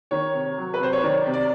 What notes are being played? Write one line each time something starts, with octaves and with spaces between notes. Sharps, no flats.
D#3 C#5
C3
F#3
B4
C3 C5
C#5
D#3 D5
C3
D5